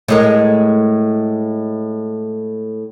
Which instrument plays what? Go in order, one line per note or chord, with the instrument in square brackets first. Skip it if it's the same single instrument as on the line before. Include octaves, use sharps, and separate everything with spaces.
[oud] A2 G#3 A#4